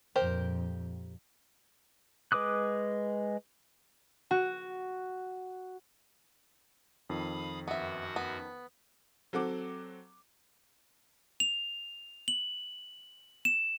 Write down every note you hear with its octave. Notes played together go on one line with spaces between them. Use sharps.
A#1 F2 G4 A#4 C5
G#3 B4 D6 D#6 F#6
F#4
F2 D#3 F5 B5 D#6
F#2 B3 F#4 E5 F#5
B3
F#3 C4 A4 F#5 D6
F7
F#7
E7